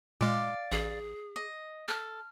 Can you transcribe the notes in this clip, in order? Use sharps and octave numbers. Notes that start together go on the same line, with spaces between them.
A#2 G#3 D5 F5
A1 G#4
D#5
A4 F6